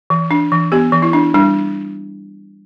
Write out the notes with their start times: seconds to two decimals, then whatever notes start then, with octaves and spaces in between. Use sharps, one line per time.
0.10 E3
0.31 D4
0.52 E3
0.72 B3 G4
0.92 E3
1.02 E4
1.13 D4
1.34 G3 D4